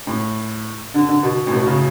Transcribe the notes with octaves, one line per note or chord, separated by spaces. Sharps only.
A2
D3
D3
B2
A2
B2
C#3